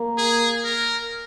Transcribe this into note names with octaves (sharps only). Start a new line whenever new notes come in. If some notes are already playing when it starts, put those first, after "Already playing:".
Already playing: A#3
G#4
A#4